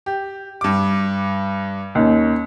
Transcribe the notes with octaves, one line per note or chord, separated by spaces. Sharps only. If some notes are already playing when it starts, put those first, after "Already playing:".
G4
G2 D6
D#2 C#4